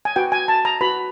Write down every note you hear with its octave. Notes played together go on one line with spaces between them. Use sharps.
G#5
F#4 B4 G5
G#5
A5
A#5
F#4 B4 B5